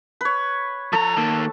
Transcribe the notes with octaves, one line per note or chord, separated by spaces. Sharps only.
B4 C#5
F3 A4 A#5
D#3 A#3